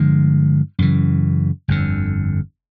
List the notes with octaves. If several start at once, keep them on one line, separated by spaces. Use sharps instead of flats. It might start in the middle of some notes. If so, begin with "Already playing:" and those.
Already playing: G2 D3 F3 G#3
F#2 C#3 E3
G1 F2 D3